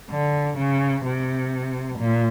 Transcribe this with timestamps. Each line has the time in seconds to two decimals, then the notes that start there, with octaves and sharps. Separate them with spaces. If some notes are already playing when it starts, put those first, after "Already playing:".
0.10 D3
0.57 C#3
1.05 C3
1.99 A#2